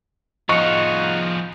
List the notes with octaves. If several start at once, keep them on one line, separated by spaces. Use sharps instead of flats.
F3 D#4 F4 F#4 G#4 D#5 C#6 C#7